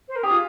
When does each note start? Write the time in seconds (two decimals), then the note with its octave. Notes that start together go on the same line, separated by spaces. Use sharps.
0.08 C5
0.16 A#4
0.23 G4 G#4
0.30 F4